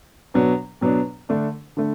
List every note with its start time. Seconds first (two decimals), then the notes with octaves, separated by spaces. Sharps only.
0.34 B2 F#3 B3 D4
0.81 B2 F#3 B3 D4
1.29 D3 A3 D4
1.77 D3 A3